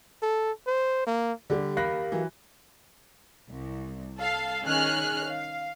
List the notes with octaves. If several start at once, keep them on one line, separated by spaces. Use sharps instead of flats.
A4
C5
A#3
D3 G3
G4 A#4 F5 B5 F#6 A#6
E3 F#3
C2
A4 F5
D#3 C#4 G#4 F6 F#6
F5